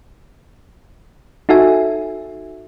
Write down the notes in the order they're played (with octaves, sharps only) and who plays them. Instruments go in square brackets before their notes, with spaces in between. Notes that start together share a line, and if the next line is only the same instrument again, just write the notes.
[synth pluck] D#4 F#4 A4 E5 G#5